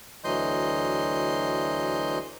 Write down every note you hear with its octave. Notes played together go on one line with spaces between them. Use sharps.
D2 E3 F#3 D#5 C6 G6